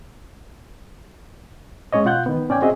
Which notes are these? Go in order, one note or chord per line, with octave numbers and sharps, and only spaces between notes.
G#3 C#4 C#5 D#5
B2 F4 F#5 F#6 G6
D#3 B3
C#4 D5 G5 G#5
C4 F#4 G#4 D#5 E5